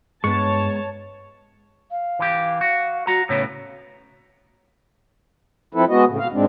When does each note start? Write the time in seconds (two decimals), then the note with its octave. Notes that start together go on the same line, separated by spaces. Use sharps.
0.24 G2 G#3 B3 C#5 A5 C#6
1.91 F5
2.19 E3 G4
2.61 F#4
3.07 F#4 F#5 A#5
3.29 A2 C#3 B3 C#5
5.75 F3 C4 E4 A4 B4
5.89 G#3 B3 F#4 D#5
6.07 A2 C#3
6.19 B2 F5
6.33 G#2 G#3 C4 D4